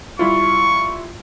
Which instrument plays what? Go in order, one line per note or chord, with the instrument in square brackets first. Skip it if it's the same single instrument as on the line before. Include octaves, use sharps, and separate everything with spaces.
[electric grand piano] G3 E4 F4 [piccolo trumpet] C#6